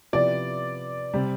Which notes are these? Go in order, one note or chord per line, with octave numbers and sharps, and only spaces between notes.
C3 F3 B3 E4 G4 D5
C3 G3 C4